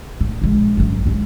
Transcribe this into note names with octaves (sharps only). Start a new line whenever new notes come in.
A2
A#1 G#3
G#1 F#2
D#2 G#2